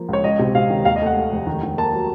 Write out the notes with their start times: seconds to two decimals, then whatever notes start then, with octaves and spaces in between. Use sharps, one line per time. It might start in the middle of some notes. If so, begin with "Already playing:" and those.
Already playing: F3 A#3
0.08 C#2 C#5
0.24 C#2 D#5
0.39 C3
0.55 C3 F5
0.70 D#3
0.85 D#2 F5
0.96 D#5
1.01 A3
1.06 F#5
1.17 A3
1.32 F1
1.47 D#3
1.63 D#3
1.78 A#3 A5
1.93 F#3